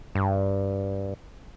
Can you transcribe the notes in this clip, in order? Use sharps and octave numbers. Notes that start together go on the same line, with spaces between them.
G2